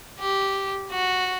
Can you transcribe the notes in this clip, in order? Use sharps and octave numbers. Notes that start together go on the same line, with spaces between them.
G4
F#4